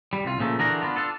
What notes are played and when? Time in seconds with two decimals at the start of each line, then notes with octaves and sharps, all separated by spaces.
0.13 G3
0.25 C2 F4
0.39 A#2 C#3 F3 A3 A#3
0.59 D3 E3 D4 F#4 G#4 A#4
0.82 B3 D4 F4
0.96 D4 F4 A4